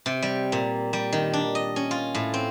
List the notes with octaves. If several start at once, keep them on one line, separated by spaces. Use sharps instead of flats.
C3
G3
A#2
G3
D#3
D4
D#5
C#4
F4
A2
C4